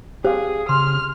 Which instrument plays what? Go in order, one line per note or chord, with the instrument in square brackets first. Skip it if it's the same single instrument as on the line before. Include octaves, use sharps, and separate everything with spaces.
[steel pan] G4 F5 [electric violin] G#4 [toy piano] C5
[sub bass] C#3 [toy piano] C6 [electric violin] F6